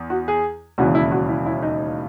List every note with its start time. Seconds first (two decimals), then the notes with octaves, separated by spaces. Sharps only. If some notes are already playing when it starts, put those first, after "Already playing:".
Already playing: E2
0.10 F#4
0.28 G#4
0.78 E1 D#2 C#3 E3 F#4
0.95 E4
1.11 F#4
1.29 E4
1.46 E4
1.62 D#4